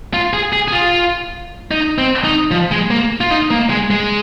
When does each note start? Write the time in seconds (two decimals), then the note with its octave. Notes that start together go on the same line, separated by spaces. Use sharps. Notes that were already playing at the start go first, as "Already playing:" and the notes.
0.13 F4
0.33 G#4
0.53 G#4
0.68 G#4
0.73 F4
1.71 D#4
1.98 C4
2.24 D#4
2.51 F3
2.72 G#3
2.91 A#3
3.21 F4
3.30 D#4
3.51 A#3
3.70 G#3
3.90 G#3